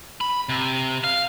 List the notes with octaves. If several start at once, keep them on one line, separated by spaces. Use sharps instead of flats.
B5
C3
F5